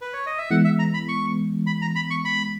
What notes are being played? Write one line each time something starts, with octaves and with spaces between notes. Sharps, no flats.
B4
C#5
D#5
E5
E3 G#3 B3 F#5
E5
A#5
B5
C#6
B5
A#5
B5
C#6
B5